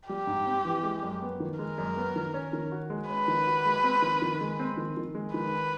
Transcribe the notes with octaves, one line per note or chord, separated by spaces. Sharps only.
G3 G4
G#2
C4
E3
G#3
F#2
B3
D#3
G#3 A#4
F#2
B3
D#3
C#4
D#3
F#4
G#3
C#4 B4
D#3
F#4
G#3
C4
D#3
D#3
G#3
C4
D#3
D#3
G#3
D#3 B4